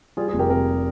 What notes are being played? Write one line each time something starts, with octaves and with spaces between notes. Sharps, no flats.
G3 F4 G#4
F4 G#4
F1
G4 A#4
C3 G4 A#4